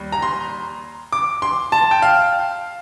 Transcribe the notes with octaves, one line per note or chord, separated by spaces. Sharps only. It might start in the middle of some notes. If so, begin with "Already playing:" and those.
Already playing: D#2 G3
A#5
C6
D6
C6
A5
G5
F5